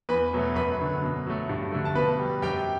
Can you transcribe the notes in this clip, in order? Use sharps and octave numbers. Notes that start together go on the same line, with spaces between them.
E2 B4 B5
B2 F#3 A3
F#2 B4 B5
D3 F#3
B2
F#3 A3
G2
D3 A3
A5
B2 B4 B5
G3
F#2 G4 G5